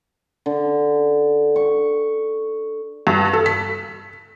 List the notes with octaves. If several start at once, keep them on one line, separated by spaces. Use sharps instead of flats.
D3
C#6
G2
A4
B6